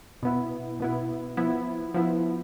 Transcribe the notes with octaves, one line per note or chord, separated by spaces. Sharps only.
B2 B3 E4
B2 B3 E4
F3 B3 E4
F3 B3 E4